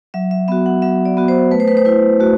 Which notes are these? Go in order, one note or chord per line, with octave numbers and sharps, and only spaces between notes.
F#3 E5
E5
B3 F#4 E5
F#5
F#3 E5
D5
B3 F#4
C5
A3 B4
C5
B4
C5
E4 B4
A3 F#4